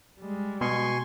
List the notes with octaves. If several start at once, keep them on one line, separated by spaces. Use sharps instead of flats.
G3 G#3
B2 G#5 C6 C#6